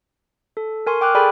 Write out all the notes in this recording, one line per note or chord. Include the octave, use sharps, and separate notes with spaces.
A4
A#4 G#5 C6 C#6
G5 D6 F6 F#6
G#4 A4 D5 G5 G#5 B5